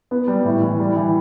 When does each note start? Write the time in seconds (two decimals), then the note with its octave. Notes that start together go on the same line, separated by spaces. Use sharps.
0.11 B3
0.28 G3
0.45 A2
0.62 E3
0.80 G3
0.96 E3